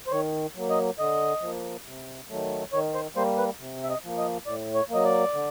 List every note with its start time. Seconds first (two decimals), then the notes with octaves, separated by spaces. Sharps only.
0.07 C5
0.12 D#3 C#5
0.56 F#3 A#3
0.70 D#5
0.99 D3 D#5
1.42 F3 A#3
1.86 C3
2.29 D#3 F#3 A3
2.73 D#3 C#5
2.94 C5
3.16 G3 A#3 C5
3.38 B4
3.60 C3
3.83 E5
3.89 D#5
4.03 F3 A#3
4.18 D#5
4.46 A2 D5
4.75 C#5
4.89 F#3 A#3 D#5
5.05 D5
5.34 D3